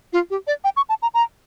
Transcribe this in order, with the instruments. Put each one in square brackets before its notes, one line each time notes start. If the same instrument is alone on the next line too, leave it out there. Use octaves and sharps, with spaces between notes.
[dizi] F4
G4
D5
G5
C#6
A5
A#5
A#5